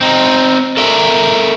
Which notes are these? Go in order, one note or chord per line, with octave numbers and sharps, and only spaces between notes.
C4 D#4
A4 A#4 D5 E5